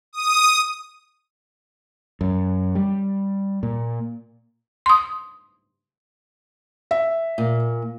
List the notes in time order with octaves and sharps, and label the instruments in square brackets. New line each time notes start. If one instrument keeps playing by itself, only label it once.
[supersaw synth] D#6
[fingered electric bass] F#2
G3
A#2
[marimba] C6 D#6
[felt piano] E5
[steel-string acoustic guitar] A#2